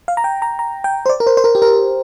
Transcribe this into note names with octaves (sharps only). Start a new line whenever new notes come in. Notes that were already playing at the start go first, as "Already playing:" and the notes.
F5
A#5
G5
A#5
A#5
G5
C5
D5
A#4
C5
C5
A#4
G4
A#4